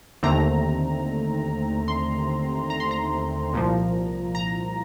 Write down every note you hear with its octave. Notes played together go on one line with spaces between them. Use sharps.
D#2 D3 A3 C4 A#5
C6
A#5
C6
A#5
C2 A#2 F3
A#5